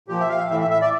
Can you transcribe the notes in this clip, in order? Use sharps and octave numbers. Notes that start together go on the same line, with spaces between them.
A#2 F3 G4
E5
F5
A2 E3 E5
E5
E5
D5